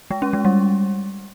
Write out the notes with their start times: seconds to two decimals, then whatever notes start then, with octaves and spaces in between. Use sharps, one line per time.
0.11 G#3
0.22 C#4
0.33 G#3
0.45 G3